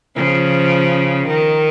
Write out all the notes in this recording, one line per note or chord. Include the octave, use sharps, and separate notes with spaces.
C#3 F3
D#3